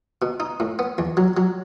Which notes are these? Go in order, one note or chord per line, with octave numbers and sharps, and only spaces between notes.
B2
D#4
A2
B3
E2
F#3
F#3